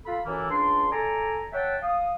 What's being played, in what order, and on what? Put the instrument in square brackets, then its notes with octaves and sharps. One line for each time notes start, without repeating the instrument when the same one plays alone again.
[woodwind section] F4 A4 B5
F#2 E3 A#3 E4 A4
C#2 D4 C6
A4 D5 G#5 A#5
C#5 E5 F#5 G5 A5
F5 D#6